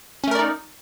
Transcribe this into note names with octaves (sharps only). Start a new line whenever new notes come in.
A3 C#4 D#4 A#4 D5